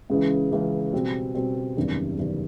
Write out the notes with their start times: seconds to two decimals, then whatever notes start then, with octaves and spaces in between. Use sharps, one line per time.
0.10 C#2 C#3 E3
0.52 C#2 C#3 E3
0.93 B2 G3 C4
1.35 B2 G3 C4
1.77 F#1 E2 C3 D#3 G3
2.18 F#1 E2 C3 D#3 G3